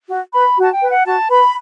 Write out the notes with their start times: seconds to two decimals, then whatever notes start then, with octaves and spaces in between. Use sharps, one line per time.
0.09 F#4
0.33 B4 B5
0.58 F#4 A5
0.73 G5
0.82 B4
0.89 F#5
1.06 F#4 A5
1.30 B4 B5